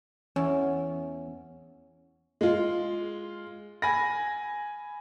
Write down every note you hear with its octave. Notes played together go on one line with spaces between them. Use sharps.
E2 C#4
G#3 F4
G#5 B5 A#6